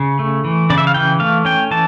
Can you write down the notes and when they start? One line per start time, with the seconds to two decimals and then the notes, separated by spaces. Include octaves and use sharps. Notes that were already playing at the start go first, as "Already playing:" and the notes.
Already playing: C#3
0.19 A3
0.45 E3
0.70 C#3 D5
0.78 E5
0.87 F5
0.94 E3 G5
1.20 A3 F5
1.45 C#4 G5
1.71 E3 A5